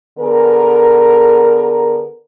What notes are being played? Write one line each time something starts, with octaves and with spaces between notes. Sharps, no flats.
D3 B3 G#4 A#4